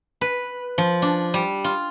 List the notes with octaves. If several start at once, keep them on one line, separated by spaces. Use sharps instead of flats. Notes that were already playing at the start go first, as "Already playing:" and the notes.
B4
F3
D4
G3
F4